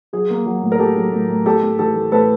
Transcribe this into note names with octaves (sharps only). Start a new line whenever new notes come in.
F#3 G#4
A#3
F#3
A2
A#4
F#3 G4 A4
F#3
A2
A2
A2 G4 A4
A2
E3 G4 A4
A3
A2 A4 B4